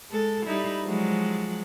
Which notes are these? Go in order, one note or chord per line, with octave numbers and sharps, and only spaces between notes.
G#3 A4
G3 D#4 E4
F3 F#3 G#3